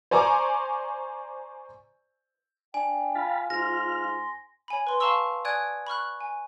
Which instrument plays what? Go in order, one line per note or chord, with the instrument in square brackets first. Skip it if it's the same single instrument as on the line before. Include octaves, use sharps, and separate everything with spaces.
[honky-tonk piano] C5 D5 G#5 A#5 C#6 D6
[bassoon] D4 [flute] G5 [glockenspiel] G#5
[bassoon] F4 [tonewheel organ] F5 A5 B5
[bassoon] G#2 [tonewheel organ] F4 F6 [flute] C6 [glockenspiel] A#6
[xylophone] C#5 G#5 B5
B4 C6
F5 A5 A#5 C6 C#6 E6
D5 G#5 D#6 F#6 G#6 D7
B5 C#6 F6 F#6
G#5